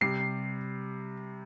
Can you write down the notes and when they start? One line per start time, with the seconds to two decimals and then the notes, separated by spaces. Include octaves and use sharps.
0.01 C3 G3 C7